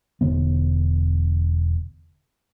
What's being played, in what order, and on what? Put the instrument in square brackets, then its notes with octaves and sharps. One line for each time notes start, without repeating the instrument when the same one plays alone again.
[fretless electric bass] E1 D3 B3